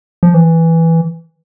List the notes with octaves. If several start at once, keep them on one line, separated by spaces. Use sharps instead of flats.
F3
E3